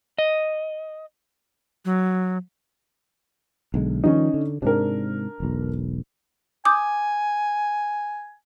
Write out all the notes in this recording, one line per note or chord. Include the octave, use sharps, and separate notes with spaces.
D#5
F#3
B1 D3 G#3
D#3 F3 G3 C#4 D#4
D3
G#2 C3 D4 A#4
E1 B1
G#5 D6 D#6 G6